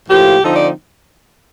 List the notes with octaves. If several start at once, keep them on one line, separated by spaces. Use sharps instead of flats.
A2 F3 A#3 G4
D3 F3 C4 D#4 A4
D5